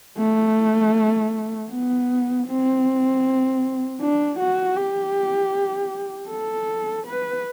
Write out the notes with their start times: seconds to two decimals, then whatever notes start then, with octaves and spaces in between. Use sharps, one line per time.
0.18 A3
1.71 B3
2.47 C4
4.01 D4
4.39 F#4
4.77 G4
6.30 A4
7.07 B4